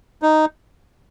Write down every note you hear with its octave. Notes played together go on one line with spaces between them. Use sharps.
D#4